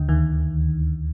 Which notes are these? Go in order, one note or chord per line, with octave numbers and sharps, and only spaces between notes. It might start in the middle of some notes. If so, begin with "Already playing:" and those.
Already playing: D2 D3
D#2 D#3